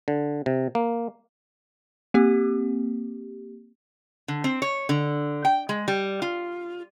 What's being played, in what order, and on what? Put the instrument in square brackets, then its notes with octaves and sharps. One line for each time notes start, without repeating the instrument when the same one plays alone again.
[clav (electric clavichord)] D3
C3
A#3
[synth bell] A#3 C4 G4
[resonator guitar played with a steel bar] D3
C4
C#5
D3
G5
G#3
G3
F4